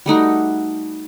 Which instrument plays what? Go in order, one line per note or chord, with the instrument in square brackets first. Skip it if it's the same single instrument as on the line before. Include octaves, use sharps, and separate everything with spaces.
[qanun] G3 A3 D#4 F#4